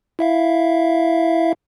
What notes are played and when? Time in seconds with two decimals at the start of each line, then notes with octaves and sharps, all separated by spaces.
0.19 E4 E5 F5